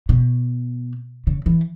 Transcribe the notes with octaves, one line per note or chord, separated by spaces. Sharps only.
B2
C#3
E3